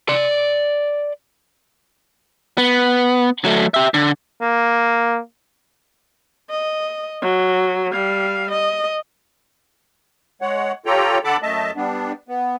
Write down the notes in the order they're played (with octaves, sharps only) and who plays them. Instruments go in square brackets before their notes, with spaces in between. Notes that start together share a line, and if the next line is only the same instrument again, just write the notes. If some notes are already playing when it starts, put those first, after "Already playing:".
[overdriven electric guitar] D5 C6
[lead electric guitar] B3
F#3 A3
G4 E5
D3
[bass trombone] A#3
[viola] D#5
F#3
G3 F5
D#5
[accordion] G#3 C#5 F#5
F4 G4 A4 C#5 G5 A#5
D3 A4 F#5 A5 B5 D6
F#2 A3 D#5 E5 A5
G3 B3 D4
B3